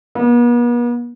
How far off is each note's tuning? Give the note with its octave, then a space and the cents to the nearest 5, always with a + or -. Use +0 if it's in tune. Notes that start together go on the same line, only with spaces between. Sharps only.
B3 -45